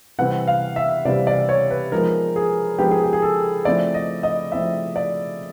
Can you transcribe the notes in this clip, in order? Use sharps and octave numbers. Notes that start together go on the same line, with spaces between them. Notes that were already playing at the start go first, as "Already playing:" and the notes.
C3 E3 G3 C4 F#5
F5
E5
C3 E3 G3 C4 D5
D5
C#5
B4
F3 G#3 B3 D#4 A#4
G#4
F3 G#3 B3 D#4 G4
G#4
G4
G#4
A4
F3 A3 C4 E4 D5
D#5
D#5
F3 A3 C4 E4 E5
D5